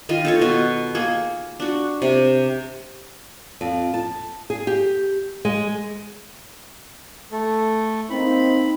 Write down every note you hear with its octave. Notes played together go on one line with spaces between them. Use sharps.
D#3 F4 D#5
D#4 A4 C#5
B2 F#4
A#3 G#4
D4 F#4
C3
F2
A5
G#4
G4
G#3
A3 A4
A#3 C4 D#4 B5